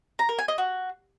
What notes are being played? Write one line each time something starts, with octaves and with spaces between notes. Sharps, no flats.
A#5
A#4
G#5
D#5
F#4